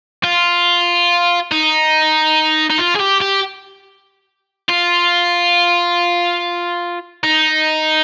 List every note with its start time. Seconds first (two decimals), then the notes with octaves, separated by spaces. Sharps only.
0.24 F4
1.52 D#4
2.70 D#4
2.78 F4
2.95 G#4
3.00 G4
3.21 G4
4.70 F4
7.23 D#4